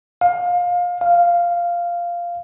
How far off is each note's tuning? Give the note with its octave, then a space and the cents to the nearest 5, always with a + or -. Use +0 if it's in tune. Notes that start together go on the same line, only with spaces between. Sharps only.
F5 +25
F5 -5